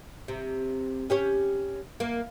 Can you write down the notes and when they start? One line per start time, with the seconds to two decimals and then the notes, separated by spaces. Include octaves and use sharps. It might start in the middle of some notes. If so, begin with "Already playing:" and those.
0.28 C3
1.10 C#4 G4 C#5
2.00 A#3